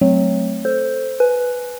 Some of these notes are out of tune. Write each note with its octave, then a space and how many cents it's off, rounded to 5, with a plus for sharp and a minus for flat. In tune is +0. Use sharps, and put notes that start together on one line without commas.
F#3 +0 A3 -15 C4 +0
A4 +0 C5 +0
B4 +0 G#5 +20